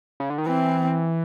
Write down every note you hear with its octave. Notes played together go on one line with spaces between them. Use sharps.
C#3
D3
D#3
E3 C4